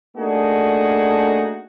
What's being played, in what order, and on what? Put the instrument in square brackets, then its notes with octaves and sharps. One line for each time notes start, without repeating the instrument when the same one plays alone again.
[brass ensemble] A3 A#3 D4 D#4 F#4 G#4